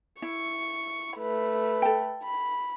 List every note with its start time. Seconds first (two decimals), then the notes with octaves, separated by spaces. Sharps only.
0.22 E4 C#6
1.17 A3 B4
1.82 A4 G5
2.24 B5